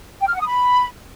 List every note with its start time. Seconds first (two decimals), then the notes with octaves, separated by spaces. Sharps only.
0.21 G5
0.27 F6
0.34 F#5
0.40 D#6
0.47 B5